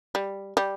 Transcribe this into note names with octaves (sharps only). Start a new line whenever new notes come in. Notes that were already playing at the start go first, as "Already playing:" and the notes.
G3
G3